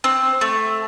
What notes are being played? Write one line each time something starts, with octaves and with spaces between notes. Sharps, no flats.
C4
A3